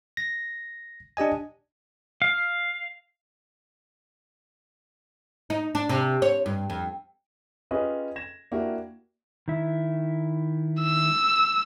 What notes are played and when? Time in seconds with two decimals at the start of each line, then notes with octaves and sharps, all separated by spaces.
0.17 A#6
1.17 D4 G4 D#5 G#5
2.22 F5
5.50 D#4
5.75 D4
5.89 C3
6.22 C#5
6.46 G2
6.70 F2
7.71 C#4 F4 G4 G#4 B4 D#5
8.16 G#6 A#6 E7
8.52 A#3 D4 E4 F#4 G4
9.48 D#3 E4
10.81 E6